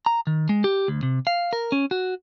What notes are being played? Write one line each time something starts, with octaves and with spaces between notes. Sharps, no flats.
A#5
D#3
G#3
G4
D2
C3
F5
A#4
C#4
F#4